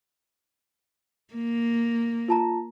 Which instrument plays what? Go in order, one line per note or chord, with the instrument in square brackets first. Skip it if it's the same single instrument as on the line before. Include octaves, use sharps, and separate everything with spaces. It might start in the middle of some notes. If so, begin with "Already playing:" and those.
[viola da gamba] A#3
[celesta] F4 A5 A#5